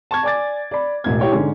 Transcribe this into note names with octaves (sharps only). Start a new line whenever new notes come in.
A5 C#6 G#6
D5 G#5 D6 A6
D5 B5
E1 A1 G#6
E4 G4 C#5 G5
G#2 D3 G#3 C#4